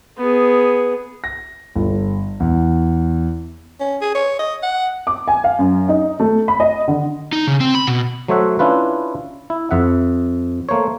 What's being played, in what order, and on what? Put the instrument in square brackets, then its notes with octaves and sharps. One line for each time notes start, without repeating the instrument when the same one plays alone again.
[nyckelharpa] B3 G#4
[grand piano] A#6
G1
E2
[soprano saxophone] C#4
G#4
C#5
D#5
F#5
[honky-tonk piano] D6
G#5
F5
F#2
D#4
A3
B5
D#5
D3
[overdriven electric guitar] D#4
C#3
C4
B5
B2
[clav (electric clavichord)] F#3 A3 C5 C#5 E5 F#5
C#4 D4 E4 F4 B4
E4
F2 E5 F#5
A3 A#3 C5 C#5